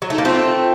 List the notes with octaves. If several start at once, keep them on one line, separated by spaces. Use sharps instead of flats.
F#3
A3 D#4
A#3
A3 C4 F4